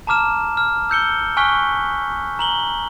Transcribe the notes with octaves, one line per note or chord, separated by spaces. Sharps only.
A5 A#5 D6 F6 E7
F6
E6 G6 C#7 G7
G#5 C#6 F6 F#6 B6 G7
A#5 F#7 G7